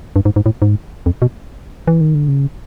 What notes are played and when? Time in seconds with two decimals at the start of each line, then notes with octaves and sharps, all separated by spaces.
0.16 G2
0.25 G#2
0.36 G#2
0.46 A2
0.62 G#2
1.06 F2
1.22 B2
1.87 E3
2.01 D#3
2.15 D3
2.28 C#3